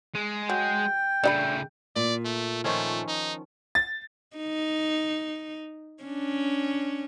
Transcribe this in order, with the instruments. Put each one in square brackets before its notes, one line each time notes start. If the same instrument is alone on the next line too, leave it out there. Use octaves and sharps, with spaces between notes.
[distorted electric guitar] G#3
[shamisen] F#3 [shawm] G5
[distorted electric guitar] C#3 A3 [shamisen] D4 D#5 B5
[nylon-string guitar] A#2 [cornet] D5
[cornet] A3
[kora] D#3 F3 C#4 [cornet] A3
[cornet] D#4
[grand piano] A6
[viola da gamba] D#4
C#4 D4